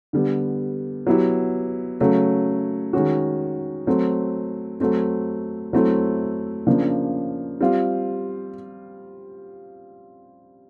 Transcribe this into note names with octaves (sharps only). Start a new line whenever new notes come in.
D3 G3 B3
F#3 B3 E4 G4
C#3 F#3 A3
D#3 G#3 C#4 F#4
F#3 A3 C4
F#3 A3 C4
F#3 A3 C4 E4
C#3 F3 A#3 D4
G3 C4 F4